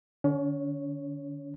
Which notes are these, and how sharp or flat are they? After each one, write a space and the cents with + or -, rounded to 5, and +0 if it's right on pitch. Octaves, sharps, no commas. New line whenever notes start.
D3 +25 C#4 +45 C#5 +0